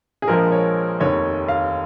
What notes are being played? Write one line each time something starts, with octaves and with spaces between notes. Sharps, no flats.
G#4
A#1 A#2 F3 G#3 A#4
C#5
F1 D#2 D#3 C#5
F5